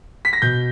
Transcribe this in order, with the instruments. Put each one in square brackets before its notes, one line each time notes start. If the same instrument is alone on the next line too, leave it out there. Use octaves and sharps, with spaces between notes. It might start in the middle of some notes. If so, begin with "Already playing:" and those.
[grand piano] B6
A#6
B2 G6